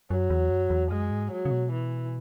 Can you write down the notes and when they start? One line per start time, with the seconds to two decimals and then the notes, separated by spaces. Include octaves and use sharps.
0.10 F#2 F#3
0.30 E2
0.50 F#2
0.70 E2
0.91 F#2 G#3
1.11 G#2
1.32 F#3
1.45 C#3
1.51 B2
1.72 E3